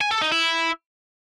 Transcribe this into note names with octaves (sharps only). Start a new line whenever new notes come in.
G#5
A4
D#4
E4